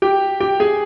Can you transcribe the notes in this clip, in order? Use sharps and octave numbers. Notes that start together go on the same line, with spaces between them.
G4 G5
G4 G5
G#4 G#5